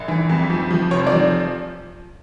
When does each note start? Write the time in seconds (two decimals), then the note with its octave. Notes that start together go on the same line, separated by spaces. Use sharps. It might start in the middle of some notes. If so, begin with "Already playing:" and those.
Already playing: A#1
0.08 E3
0.29 F2
0.50 F3
0.71 F3
0.91 F1 C#5
1.07 D5
1.12 F3